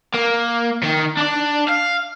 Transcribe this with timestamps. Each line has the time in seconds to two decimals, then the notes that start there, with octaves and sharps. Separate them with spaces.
0.15 A#3
0.83 D#3
1.17 D4 D5
1.69 F5